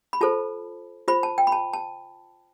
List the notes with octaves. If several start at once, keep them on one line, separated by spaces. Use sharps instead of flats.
B5
F4 A4 C5 A5
F4 C5 B5
A5
G5
B5
A5
A5